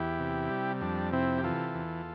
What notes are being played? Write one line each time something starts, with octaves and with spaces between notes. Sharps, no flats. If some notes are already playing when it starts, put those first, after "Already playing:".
Already playing: E2 E4 G4
C3
G3
F2 D4
C3 C4 E4
G4
E3 F4 A4
E2